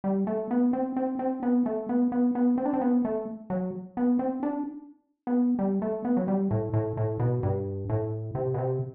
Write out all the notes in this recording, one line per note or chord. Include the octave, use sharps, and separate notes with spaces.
G3
A3
B3
C4
C4
C4
B3
A3
B3
B3
B3
C4
D4
C4
B3
A3
F#3
B3
C4
D4
B3
G3
A3
B3
F#3
G3
A2
A2
A2
B2
G2
A2
C3
B2
C3